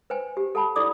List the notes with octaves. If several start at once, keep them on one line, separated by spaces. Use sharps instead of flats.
B4 C5 G5 G#5
G4
A4 F#5 A5 B5
E4 A4 D5 D6 D#6